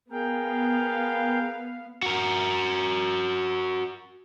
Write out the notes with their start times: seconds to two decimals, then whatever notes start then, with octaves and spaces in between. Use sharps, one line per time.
0.12 B3 G#4 A#4 F5 G5
2.03 F#4 A#4